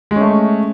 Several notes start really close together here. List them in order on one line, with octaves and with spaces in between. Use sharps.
G#3 C#4 A3